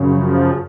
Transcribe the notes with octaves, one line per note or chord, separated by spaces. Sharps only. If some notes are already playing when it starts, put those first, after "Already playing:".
Already playing: F#2 C#3
F3